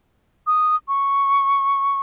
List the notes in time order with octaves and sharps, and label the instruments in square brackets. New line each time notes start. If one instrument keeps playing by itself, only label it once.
[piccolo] D#6
C#6